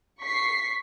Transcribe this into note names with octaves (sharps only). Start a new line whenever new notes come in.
C#6 B6 C7